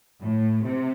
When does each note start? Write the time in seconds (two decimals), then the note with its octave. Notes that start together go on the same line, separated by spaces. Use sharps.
0.20 A2
0.63 C3